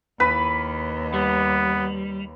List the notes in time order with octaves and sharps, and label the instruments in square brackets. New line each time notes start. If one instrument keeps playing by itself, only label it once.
[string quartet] D#2 [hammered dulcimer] B4
[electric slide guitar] G3 [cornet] B3